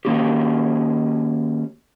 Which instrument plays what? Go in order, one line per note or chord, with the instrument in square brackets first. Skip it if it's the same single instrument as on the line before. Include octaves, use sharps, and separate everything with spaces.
[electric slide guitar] D#3 A#3 C#4 F#4 G4